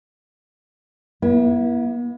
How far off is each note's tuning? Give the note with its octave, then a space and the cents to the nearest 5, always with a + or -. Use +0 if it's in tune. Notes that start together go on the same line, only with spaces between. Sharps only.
B3 -45 E4 +0